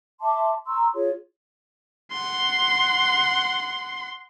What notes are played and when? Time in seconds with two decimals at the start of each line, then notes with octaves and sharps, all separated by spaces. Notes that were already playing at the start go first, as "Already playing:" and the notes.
0.21 E5 A5 C6 D6
0.66 A#5 C6 C#6 E6
0.94 F4 G#4 C#5
2.13 F#5 C6